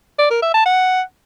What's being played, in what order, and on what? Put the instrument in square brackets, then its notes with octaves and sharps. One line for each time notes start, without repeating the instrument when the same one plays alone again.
[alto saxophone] D5
A#4
E5
A5
F#5